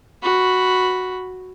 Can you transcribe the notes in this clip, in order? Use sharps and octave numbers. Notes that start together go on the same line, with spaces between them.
F#4 B5